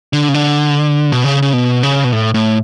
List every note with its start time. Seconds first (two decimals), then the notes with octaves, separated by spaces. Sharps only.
0.13 D3
0.29 C#3
0.34 D3
1.12 B2
1.24 C#3
1.42 C#3
1.53 B2
1.83 C#3
2.04 B2
2.12 A2
2.34 A2